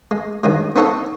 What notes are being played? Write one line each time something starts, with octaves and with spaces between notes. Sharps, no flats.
G#3
G2 D#3 F#3 G#3
B3 C4 D#4 A4 C#5 F#5